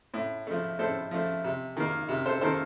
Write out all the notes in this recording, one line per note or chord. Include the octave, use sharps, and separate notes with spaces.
A2
F3 A3
A2 A4 C5
F3 A3
C3
D#3 A#3
C3
A4 C5
D#3 A#3 A4 C5